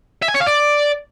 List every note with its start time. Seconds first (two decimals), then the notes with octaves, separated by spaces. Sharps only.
0.22 E5
0.29 G#5
0.35 C#5
0.41 F5
0.47 D5